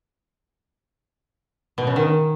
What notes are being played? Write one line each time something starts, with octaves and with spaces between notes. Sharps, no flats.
B2
C#3
D#3